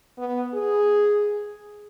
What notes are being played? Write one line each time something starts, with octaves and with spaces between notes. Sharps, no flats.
B3
G#4